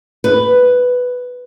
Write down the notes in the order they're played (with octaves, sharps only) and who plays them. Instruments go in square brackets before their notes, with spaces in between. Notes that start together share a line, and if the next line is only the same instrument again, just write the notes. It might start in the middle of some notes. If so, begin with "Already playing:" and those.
[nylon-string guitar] B4